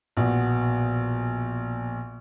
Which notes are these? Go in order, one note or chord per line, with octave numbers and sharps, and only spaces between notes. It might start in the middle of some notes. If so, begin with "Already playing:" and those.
A#1 B2